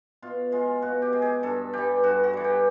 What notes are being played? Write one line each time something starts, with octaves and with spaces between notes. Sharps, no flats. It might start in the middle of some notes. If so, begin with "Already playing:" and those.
B2 F4
G#3 F4
B2 F#4
G4
G#3
G#4
G2 A4
E3 G3 G4
G2 F#4
F#4
E3 G3
G4